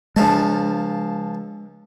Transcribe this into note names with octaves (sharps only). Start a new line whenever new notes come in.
C#2 F3 G#3 D4 A5